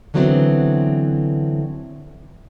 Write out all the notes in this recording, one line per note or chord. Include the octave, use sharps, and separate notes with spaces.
D3 E3 F#3 B3 C4 D4